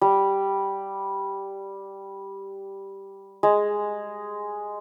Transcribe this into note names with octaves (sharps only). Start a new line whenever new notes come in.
G3
G#3